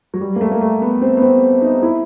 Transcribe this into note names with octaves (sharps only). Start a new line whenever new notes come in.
F#3
G3
A#3
A3
A#3
A3
B3
C4
B3
C4
D#4
E4